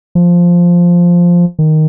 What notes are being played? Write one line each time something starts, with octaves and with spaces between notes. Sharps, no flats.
F3
D#3